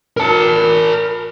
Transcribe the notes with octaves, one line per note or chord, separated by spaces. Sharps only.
A#4 A5